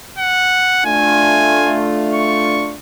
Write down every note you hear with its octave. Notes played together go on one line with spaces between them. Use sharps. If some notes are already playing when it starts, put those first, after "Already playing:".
F#5
A3 D4 F4 G#5
C#6